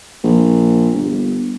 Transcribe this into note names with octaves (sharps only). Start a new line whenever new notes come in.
A#1
G1